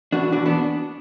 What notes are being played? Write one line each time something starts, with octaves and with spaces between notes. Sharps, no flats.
E3 D4 F#4
E2 D4 F#4
B3 D4